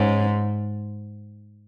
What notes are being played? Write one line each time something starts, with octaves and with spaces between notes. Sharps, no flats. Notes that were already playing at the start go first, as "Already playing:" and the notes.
Already playing: G#2 C#4